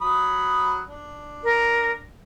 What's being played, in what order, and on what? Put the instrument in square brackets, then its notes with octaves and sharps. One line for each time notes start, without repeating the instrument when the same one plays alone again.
[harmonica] F#3 B5 D#6
D4
[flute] A#4